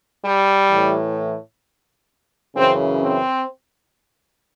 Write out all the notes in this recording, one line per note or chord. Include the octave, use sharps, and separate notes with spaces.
G3
A2 E3
F#2 C#3 E3 C4
C4